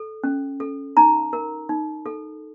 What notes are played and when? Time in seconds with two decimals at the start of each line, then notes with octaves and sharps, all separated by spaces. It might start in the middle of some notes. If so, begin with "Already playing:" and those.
Already playing: A4
0.24 C#4
0.60 A4
0.97 D#4 A#5
1.33 A#4
1.69 D#4
2.06 A4